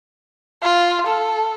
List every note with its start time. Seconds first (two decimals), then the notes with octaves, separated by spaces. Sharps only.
0.62 F4
1.06 A4